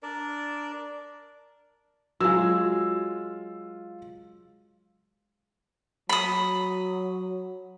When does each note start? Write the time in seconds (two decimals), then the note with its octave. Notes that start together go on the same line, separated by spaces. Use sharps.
0.03 D4 A#4 D5
2.20 F#3 G#3 F4 E6
6.09 F#3 B5 D#6